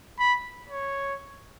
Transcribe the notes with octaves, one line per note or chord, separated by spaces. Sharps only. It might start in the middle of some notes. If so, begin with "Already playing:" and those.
B5
C#5